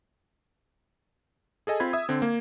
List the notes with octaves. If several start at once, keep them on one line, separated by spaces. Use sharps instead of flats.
G#4 A4 D#5 G#5
C4 F4 B5 G#6
E5 D#6
D3 C4
A#3